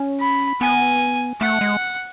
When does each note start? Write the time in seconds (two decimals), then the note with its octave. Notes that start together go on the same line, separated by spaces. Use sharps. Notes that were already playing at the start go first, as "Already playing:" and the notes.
Already playing: C#4
0.21 B5
0.61 B3 G#5
1.41 A3 F#5
1.61 G#3